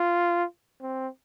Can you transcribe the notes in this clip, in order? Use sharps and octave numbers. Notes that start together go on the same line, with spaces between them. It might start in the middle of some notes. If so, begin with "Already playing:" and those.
Already playing: F4
C4